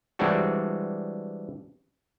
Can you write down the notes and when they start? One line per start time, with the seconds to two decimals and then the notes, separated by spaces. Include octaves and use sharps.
0.19 E3 G3 G#3 C4 D4 F#4